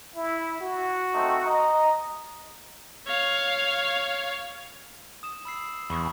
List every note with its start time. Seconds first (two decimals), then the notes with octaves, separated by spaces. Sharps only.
0.16 E4
0.61 F#4
1.14 A3 C4 D#4
1.45 D#5 A#5
3.07 C#5 F5
5.23 D#6 E7
5.45 B5 E6 C7
5.90 E2 B5 C#6 D#6